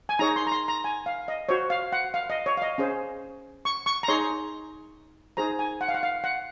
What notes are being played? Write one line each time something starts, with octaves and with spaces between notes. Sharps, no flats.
G#5
D#4 G#4 C#5 A#5
C6
A#5
C6
A#5
G#5
F5
D#5
F#4 C5 C#5
F5
F#5
F5
D#5
C#5
F5
D#5
C#4 G#4 C5
C#6
C#6
A#5
D#4 G#4 C#5 C6
D#4 G#4 C5 A#5
G#5
F#5
F5
F#5
F5
F#5